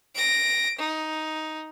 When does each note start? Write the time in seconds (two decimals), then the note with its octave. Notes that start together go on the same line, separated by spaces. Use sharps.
0.15 A#6 D7
0.79 D#4